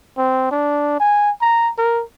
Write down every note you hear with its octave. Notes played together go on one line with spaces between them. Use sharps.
C4
D4
G#5
A#5
A#4